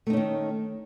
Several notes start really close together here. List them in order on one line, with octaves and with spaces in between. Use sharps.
A3 D#4 C#4 D#3